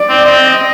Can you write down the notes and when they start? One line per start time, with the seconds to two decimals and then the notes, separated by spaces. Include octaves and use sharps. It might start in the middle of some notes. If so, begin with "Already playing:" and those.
Already playing: D5
0.09 C4
0.25 C4 D#5